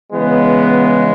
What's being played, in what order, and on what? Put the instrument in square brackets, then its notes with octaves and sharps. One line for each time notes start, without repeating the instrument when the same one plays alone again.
[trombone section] C#3 E3 G#3 B3